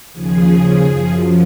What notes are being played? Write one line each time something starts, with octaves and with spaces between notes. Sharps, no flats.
D#2 C#3 F3 G#4
F#2 F3